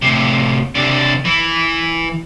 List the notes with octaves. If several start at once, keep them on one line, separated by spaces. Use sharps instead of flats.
A2 C3
C3 D4
E3